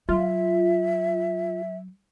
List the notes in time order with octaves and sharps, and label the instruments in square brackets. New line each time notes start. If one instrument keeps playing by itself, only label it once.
[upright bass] F#3 [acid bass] F4 [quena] E5